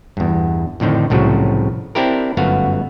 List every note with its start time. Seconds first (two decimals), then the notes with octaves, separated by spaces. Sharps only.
0.17 E2 G2
0.80 F2 A2 D3 D#3 C4
1.10 C2 A2 C#3 F3 F#3
1.95 C4 D4 E4 G4 A#4
2.37 G1 F#2 A3 B3 F#4 F5